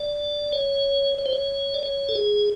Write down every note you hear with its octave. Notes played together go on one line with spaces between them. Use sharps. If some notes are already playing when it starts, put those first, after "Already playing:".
Already playing: D5
C#5
C#5
C5
C#5
D5
C#5
A4
G#4